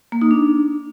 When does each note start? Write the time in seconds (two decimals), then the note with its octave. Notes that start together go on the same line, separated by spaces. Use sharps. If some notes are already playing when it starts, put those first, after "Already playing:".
0.12 A#3
0.21 D#4
0.31 D4